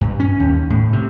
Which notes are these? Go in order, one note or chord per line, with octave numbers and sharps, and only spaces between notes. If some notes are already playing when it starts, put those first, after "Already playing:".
G2
C#4
D#2
A2
C3